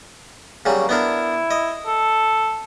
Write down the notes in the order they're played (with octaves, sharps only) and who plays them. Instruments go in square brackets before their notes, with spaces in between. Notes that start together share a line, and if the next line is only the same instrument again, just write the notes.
[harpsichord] C#3 F#3 G3 [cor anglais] A#3
[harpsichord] B3 D4 A#4 [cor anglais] E4
[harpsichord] D#5
[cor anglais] A4